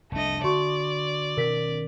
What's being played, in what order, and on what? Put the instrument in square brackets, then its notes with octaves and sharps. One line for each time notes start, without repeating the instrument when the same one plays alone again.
[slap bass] F1 C2 D4 [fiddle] A3 D#5
[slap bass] D3 [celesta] F#4 C6 C#6 [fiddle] D5
[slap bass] B2 D#3 C#4 [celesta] A#4 B6